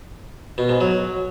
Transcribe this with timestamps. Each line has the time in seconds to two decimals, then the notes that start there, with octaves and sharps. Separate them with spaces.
0.58 B2
0.69 G#2
0.81 F#3